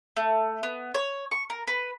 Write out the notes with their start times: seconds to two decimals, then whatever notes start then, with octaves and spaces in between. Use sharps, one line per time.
0.17 A3
0.63 B3
0.94 C#5
1.31 C#6
1.50 A#4
1.67 B4